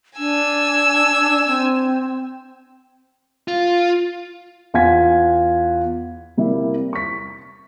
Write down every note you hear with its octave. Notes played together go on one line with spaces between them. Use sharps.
D4 G#5 E6
C4
F4
E2 F4 F#5 G#5 G#6 B6
C3 G3 A#3 E4
C#6 B6